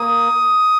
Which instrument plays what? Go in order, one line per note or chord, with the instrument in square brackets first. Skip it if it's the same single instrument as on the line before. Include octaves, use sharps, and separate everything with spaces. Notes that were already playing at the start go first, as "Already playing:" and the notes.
Already playing: [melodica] A#3 D#6